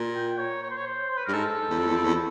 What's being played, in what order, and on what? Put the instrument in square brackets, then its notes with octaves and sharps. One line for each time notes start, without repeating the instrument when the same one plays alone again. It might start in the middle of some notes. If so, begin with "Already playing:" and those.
Already playing: [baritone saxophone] A#2
[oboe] G5
C#5
C#5
C5
C#5
C5
C5
B4
[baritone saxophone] G2 [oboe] A#4
[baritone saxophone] G#2 [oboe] A4
[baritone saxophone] E2
F2
E2
F2
E2